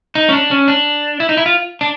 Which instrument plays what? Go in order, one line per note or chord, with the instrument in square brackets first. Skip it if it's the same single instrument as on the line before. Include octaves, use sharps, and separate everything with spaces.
[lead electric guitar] D#4
C#4
D4
C#4
D4
E4
D#4
E4
F4
D4